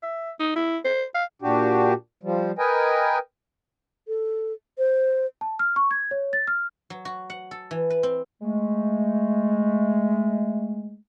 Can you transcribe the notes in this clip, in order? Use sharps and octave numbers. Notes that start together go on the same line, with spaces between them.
E5
D#4
E4
C5
F5
A#2 D4 F#4 G4
F3 G3
A#4 B4 D#5 G5 G#5
A4
C5
A5
F6
C#6
G#6
C#5
A6
F6
F#3
F#4
F#5
A4
E3
B4
C4
G#3 A3